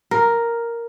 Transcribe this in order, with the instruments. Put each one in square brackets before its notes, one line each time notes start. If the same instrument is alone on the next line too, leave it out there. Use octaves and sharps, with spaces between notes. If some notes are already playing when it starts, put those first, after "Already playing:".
[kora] A#4